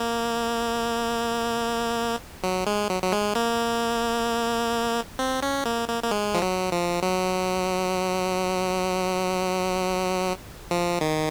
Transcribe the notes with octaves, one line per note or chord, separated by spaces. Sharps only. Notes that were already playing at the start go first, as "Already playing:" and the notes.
Already playing: A#3
F#3
G#3
F#3
F#3
G#3
A#3
C4
C#4
A#3
A#3
A#3
G#3
F3
F#3
F3
F#3
F3
D#3